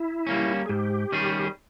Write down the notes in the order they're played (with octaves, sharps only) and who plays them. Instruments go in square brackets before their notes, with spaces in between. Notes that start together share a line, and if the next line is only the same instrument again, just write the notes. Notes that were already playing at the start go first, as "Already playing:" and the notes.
Already playing: [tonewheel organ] E4
[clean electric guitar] G3 A#3 C#4
[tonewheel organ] G#4
[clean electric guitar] G#2 [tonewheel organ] G4
[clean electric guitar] D#3 G3 C#4 G#4